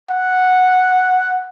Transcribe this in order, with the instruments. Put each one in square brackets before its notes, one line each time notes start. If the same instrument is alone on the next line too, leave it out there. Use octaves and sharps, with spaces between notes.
[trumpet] F#5